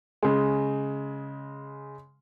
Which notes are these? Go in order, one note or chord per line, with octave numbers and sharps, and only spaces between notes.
C#3 G#3